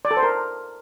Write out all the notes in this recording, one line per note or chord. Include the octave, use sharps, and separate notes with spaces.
D5
A4
C5
A#4